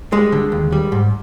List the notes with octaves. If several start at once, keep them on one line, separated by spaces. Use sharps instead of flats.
G3 G#3
D3
D#2
G3
G#2